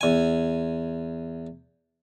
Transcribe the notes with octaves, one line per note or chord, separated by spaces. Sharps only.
E2 G#5